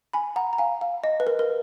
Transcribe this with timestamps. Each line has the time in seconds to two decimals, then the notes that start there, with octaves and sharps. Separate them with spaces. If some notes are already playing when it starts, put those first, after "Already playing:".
0.13 G#5 B5
0.36 F#5 A#5
0.53 A#5
0.58 F5 G#5
0.81 F5
1.04 D#5
1.20 B4
1.27 A#4
1.39 A#4